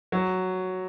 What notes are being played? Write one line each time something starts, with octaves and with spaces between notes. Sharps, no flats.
F#3